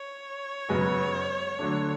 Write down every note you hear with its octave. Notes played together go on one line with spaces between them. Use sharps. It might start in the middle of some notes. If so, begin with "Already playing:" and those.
Already playing: C#5
F#2 C#3 G#3 B3 F#4
D3 F#3 A3 D4